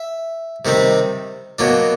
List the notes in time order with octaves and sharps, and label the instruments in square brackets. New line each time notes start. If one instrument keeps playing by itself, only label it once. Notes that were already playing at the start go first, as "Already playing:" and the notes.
Already playing: [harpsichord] E5
C3 D#3 G3 C4
B2 F#3 A#3 D4